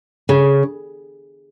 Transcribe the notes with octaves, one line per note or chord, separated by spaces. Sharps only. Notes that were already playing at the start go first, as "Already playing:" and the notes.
C#3